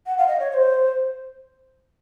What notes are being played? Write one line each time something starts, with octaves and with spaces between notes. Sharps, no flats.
F#5
F5
D#5
C#5
C#5
C5